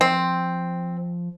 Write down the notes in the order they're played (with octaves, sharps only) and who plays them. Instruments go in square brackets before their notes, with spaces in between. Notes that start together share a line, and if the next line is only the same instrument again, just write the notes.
[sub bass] F3 [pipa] C4